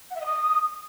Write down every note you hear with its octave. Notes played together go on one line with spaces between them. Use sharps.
F#5
E5
D#5
D#6